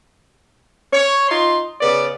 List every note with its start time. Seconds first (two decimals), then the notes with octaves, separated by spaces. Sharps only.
0.92 C#5
1.29 D#4 F4 C6
1.80 C#3 B3 D5